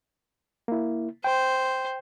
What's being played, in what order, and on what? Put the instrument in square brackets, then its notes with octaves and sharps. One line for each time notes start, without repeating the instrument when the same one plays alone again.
[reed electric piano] A#3 E4
[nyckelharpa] C5 [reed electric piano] G5